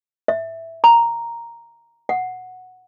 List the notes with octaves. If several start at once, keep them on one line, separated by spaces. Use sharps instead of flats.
E5
A#5
F#5